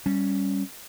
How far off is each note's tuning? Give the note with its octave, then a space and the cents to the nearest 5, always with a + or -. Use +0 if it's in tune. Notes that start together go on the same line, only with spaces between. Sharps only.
G3 +0 C#4 +0